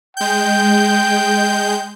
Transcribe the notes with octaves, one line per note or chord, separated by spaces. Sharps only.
G#3 G5 G6